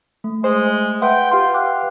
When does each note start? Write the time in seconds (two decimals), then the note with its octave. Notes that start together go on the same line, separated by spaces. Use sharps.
0.24 A3
0.44 G#3 C5
1.02 B4 E5 F#5 G5 C6
1.31 F4 G4 C6
1.54 F5 G5 D6 F#6